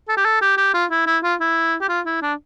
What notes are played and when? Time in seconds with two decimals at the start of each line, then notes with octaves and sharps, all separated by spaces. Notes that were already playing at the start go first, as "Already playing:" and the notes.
0.08 A4
0.17 G4
0.25 A4
0.41 G4
0.57 G4
0.74 F4
0.91 E4
1.06 E4
1.23 F4
1.40 E4
1.81 G4
1.89 F4
2.06 E4
2.22 D4